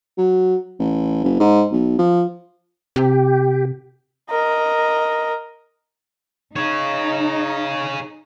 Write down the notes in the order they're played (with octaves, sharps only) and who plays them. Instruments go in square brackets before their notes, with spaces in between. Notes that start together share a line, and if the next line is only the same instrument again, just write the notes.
[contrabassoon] F#3
A1
F#1
G#2
B1
F3
[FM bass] C3 [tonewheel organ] G4
[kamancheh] A#4 D#5
[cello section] D#4 [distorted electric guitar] G#4 C#5